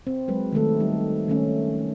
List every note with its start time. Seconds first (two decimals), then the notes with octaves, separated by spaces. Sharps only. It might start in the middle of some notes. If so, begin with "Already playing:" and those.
0.07 C4
0.28 F#3 G#3 B4
0.52 D#3 G#3 A3 A4
0.80 G3 D#4
1.28 D#3 A3 C#4